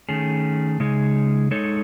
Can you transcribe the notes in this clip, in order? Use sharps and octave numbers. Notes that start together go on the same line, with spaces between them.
D#3 A3 C#4 G#4
C#3 G#3 D#4 G#4
G#3 D#4 A4 C#5